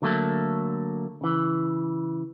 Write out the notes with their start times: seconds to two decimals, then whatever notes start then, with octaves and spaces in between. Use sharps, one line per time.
0.02 D3 F#3 A3 A#3 A4
1.21 C#3 E3